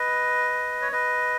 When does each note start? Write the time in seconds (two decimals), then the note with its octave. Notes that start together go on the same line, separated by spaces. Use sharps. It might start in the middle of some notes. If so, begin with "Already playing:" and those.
Already playing: B4 D#5
0.81 C#5
0.92 B4 D#5